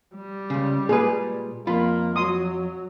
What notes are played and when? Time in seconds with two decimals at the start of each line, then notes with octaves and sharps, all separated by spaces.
0.15 G3
0.50 C#2 C#3
0.89 A#2 G#3 G#4 B4
1.67 F2 A#3 F4 B5
2.16 F#3 C6 D#6